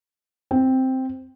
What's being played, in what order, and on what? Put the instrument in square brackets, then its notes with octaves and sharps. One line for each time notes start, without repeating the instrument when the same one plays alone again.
[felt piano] C4